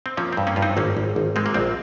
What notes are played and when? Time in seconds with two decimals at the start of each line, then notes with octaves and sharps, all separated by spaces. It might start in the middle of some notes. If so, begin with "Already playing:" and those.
0.06 C4
0.17 F3 A#3 C#4
0.33 G2 C4
0.47 A#3 C#4
0.56 G2 F4
0.62 C4 D#4
0.77 G#1 A#3 C#4
0.97 G#1
1.16 G#1
1.36 G#3 C4
1.46 A#3
1.54 A#1 C4